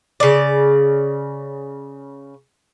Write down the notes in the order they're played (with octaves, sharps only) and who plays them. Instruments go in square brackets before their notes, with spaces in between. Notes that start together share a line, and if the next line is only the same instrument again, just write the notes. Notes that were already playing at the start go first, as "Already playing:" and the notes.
[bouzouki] C#3 D5